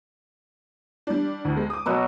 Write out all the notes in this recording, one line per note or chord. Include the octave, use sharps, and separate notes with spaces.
G3 D4
D2
G#3
D6 D#6
B2 F#3 F#4